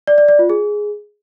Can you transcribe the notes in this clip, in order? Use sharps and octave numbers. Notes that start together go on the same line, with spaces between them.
D5
D5
D5
F4
G#4